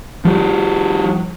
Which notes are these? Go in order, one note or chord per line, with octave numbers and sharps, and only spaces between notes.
F3 G3